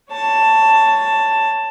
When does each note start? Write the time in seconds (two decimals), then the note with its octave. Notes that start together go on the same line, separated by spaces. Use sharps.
0.10 C#5 A5